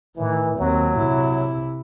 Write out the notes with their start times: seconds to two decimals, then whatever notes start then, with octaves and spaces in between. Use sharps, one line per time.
0.16 A2 D#3 E3
0.58 D#2 F#3 C4
0.97 C3 E4